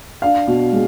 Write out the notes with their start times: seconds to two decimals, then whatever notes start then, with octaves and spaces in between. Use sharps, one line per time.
0.22 D4 F5
0.47 B2
0.72 G#3